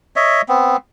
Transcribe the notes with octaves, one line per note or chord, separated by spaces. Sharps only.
C#5 D#5 E5
B3 C4